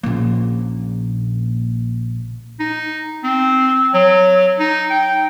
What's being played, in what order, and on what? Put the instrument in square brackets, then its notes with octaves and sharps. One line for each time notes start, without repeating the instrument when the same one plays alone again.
[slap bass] A#1 A#3 [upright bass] A#2 C#3
[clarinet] D#4
C4
F#3
D#4
G5